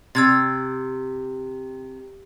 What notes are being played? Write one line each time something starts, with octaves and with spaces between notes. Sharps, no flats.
C3 E6 G#6 A6